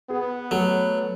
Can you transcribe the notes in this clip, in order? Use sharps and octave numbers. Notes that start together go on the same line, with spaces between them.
B3 G#4
F#3 A3